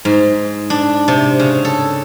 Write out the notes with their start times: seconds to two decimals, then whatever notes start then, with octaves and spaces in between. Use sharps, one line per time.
0.05 G#2
0.70 D4
1.08 C3
1.40 C#3
1.65 A4